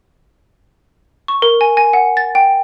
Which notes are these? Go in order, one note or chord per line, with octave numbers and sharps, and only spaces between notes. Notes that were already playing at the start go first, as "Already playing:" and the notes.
C#6
A#4
G#5
G#5
F#5
A6
G5